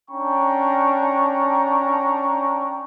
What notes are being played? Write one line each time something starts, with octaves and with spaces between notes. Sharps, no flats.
C#4 D4 G5 A#5 C#6